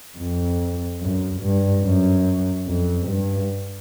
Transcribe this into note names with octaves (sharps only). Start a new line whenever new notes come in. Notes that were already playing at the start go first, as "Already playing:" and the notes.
F2
F#2
G2
F#2
F2
G2